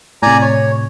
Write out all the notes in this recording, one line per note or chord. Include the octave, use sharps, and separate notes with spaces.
A2 C3 D5 G#5 A#5
C#5